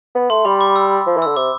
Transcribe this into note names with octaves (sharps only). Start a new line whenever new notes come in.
B3
A3 C6
G3 B5
D6
E6
F3
E3
D3 E6
C3 D6